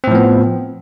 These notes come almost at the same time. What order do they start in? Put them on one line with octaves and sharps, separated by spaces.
C4 A2 F3 B3